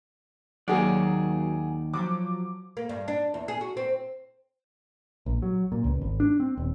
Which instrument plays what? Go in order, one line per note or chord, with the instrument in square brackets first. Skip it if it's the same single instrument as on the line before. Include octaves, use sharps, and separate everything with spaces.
[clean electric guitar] D#2 D#3 D5 [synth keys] F#3 A#3 [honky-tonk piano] G#4 F#5
[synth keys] F3 F#3 [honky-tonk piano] D6
[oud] A#3
G2
D4
E2
G#4
F#4
C4
[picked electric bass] A#1
F#3
A#2
C#2
G#1
D4
C4
D#1